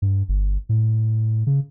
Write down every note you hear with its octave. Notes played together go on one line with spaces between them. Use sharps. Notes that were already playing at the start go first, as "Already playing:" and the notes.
G2
G1
A2
C#3